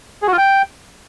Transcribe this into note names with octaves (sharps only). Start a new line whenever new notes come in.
G#4
F#4
F4
G5